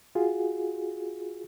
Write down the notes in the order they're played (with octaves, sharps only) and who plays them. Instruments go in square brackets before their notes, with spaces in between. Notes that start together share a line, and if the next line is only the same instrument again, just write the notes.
[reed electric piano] F4 F#4 G#4